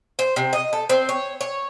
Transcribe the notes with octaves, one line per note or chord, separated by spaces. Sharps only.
C5
C3
D#5
A4
C4
C#5
C#5